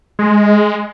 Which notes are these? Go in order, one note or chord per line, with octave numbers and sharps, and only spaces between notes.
G#3